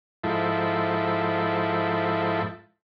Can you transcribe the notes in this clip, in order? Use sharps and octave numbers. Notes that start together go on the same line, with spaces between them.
G#2 F3 E4 A4